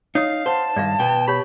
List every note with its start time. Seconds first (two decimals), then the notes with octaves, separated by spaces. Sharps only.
0.15 D#4 C#5 F5 D#6
0.46 C5 F#5 A5
0.76 G2 D#3 D5 E5 F5
0.99 B2 B3 G5
1.28 G4 C#5 B5